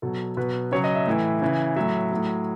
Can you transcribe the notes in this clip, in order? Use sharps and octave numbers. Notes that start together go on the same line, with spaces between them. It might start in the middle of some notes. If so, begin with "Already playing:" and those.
B2 F#3 A4
B2 F#3 B4
C#3 F#3 C#5
D#5
E5
A2 E3
C#3 E3
A2 F#3 E5
A2 F#3